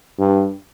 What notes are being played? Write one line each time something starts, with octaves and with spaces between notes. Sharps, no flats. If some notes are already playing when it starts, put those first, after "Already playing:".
G2